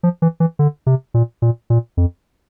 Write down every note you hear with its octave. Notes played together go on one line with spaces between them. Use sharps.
F3
E3
E3
D3
C3
A#2
A#2
A#2
F2